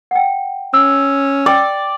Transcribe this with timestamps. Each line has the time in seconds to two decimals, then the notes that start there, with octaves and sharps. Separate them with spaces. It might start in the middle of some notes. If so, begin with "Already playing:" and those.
0.11 F#5 G5
0.74 C#4 E6
1.46 D5 G5